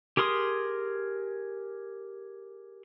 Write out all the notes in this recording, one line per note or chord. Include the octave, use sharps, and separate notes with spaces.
G4 G#4 A#4 C6 D#6